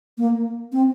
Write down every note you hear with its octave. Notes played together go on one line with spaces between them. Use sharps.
A#3
C4